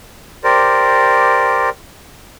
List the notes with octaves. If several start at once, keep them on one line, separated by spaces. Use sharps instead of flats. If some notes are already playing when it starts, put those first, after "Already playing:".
G4 A#4 C5 D5